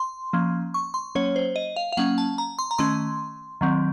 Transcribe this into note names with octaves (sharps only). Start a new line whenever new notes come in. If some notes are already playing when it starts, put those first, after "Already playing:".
Already playing: C6
F3 A#3 C#4
C#6
C6
F#3 A#3 C#4 C#5
C5
D#5
F5
F5
F#3 A#3 C#4 F#5
A5
A#5
C6
A#5
D#3 A3 C#4 C6
D#3 F#3 C4